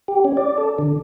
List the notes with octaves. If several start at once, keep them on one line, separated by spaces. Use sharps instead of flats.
G4
C#4
D5
A4
D3